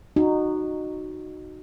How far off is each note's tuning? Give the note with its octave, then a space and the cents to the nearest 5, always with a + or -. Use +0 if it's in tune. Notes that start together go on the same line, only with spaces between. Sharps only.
D#4 -20 F#4 +0